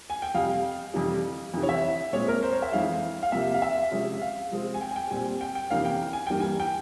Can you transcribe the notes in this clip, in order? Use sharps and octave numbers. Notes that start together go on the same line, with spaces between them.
G#5
G5
F2 C3 G3 F5
F2 C3 E3 G3
F2 C3 E3
C#5
E5
A#2 G#3 C4 C#5
A#4
C5
C#5
E5
F2 E3 G#3 F5
F5
C3 F3 A#3 E5
F5
E5
C3 F3 G#3 C#4
F5
C3 F3 G#3 C4
G#5
G5
G#5
G5
A#2 G3 C4 G#5
G5
G5
F2 C3 E3 A#3 C#4 F5
G5
G#5
G2 E3 G3 A#3 G5
G#5
G5